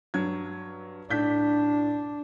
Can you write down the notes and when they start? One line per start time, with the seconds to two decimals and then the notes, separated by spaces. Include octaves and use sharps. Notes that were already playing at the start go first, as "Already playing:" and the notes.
0.14 G2 F#3 G#6
1.10 A2 D4 G6 B6